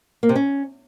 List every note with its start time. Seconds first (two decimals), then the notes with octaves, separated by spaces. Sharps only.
0.23 A#3
0.29 C3
0.36 C#4